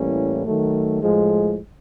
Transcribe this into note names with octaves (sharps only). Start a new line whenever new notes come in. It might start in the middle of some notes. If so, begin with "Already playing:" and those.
Already playing: A2 E3 G3 A#3 C#4
D#3 F#3 A3
A2 F3 G#3